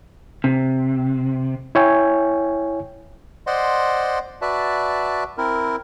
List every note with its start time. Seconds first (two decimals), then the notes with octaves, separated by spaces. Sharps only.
0.44 C3
1.75 E4 C#5 G5 G#5
3.47 C5 D5 D#5 F#5 C6
4.42 F#4 B4 D5 E5 A5
5.37 C4 E4 A#4